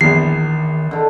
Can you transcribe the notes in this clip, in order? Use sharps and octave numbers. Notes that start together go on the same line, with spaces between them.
A#1 E2 D#3 C7
D3 D#3